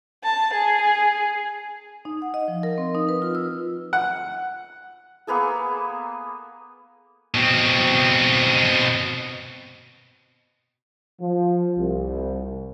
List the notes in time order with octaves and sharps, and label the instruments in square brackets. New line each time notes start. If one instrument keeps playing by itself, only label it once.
[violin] A5
G#4
[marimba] D#4
F#5
D#5
F3
A#4
C4
D#4
B4
F4
E6
[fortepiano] F#5
[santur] A#3 B3 G#4 A4
[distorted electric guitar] B2 C4
[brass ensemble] F3
C2